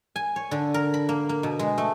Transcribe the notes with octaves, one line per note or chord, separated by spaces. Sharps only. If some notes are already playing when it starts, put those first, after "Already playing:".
G#5
C#5
D3
A#4
B5
A#3
A#3
B2
G#3
A3